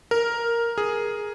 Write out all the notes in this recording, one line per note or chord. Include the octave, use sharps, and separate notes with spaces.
A#4
G#4